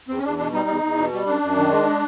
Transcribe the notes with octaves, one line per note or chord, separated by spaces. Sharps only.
E2 C4
C#4
E2 D4
B2 D4
G3 D#4
E2
E2
B2
G3
F#2 D4
F#2
D#3
G#3